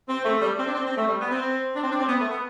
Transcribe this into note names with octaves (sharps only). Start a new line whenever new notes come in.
C4
A3
G3
C4
D4
C4
C4
A3
G3
B3
C4
D4
C4
D4
C4
B3
A3
B3